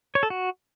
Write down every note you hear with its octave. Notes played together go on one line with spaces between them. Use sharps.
C#5
A4
F#4